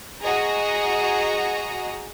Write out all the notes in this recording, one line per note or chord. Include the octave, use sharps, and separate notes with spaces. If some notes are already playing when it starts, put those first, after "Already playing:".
F#4 G#4 D#5 A#5